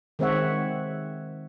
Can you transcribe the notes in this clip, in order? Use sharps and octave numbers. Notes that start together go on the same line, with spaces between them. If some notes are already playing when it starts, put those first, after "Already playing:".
D#3 G#3 C4 C#5 E5 F#5